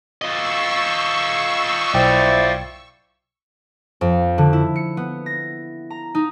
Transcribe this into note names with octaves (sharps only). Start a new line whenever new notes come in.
F4 D#5 C#6 E6
B1 E4 C5 D5 G5
F2
D3
E4
C#7
B3
A#6
A#5
D#4